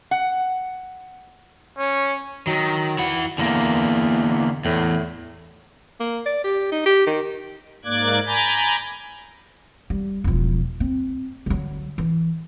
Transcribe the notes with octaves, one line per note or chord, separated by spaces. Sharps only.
F#5
C#4
D#3 F#3
E4 F#5
E2 D3 A#3
E2 A2
A#3
D5
G4
D#4
G4
D#3
G#2 A#3 D5 D6 F#6 G#6
G#5 A#5 B5 D6 G6 A6
G3
E1 F3
C4
D3 F#3
E3